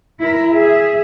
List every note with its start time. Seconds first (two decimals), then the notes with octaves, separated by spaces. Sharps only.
0.20 E4 A#4
0.51 G#4 E5